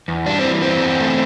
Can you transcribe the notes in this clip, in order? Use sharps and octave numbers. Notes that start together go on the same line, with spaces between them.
E2
G3 D4
C4
E3
E2 C4
E2
A3